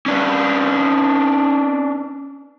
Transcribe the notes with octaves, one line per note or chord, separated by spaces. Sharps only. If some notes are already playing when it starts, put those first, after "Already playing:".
C#4 D4 B4